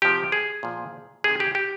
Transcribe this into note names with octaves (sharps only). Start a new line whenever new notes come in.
C3 F3 G4
G#4
A#2 F3
C3 G#4
D#3
G4
G4